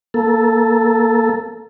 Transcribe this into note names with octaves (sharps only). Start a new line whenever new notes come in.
A#3 A4